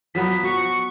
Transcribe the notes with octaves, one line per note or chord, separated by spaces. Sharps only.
F3 F#3 B3 B6
F#4 C#6